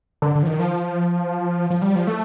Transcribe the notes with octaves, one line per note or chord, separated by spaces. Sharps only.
D3
D3
F3
D#3
F3
F3
G3
F3
A3